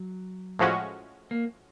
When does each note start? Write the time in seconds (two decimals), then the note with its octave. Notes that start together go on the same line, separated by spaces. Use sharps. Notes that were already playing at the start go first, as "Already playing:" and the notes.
Already playing: F#3
0.59 A2 F3 G#3 C#4 F#4
1.31 A#3